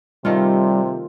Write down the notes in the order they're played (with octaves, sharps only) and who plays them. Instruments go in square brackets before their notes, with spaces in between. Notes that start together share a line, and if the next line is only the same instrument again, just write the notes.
[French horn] C3 [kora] D#3 A3 F4 [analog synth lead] G3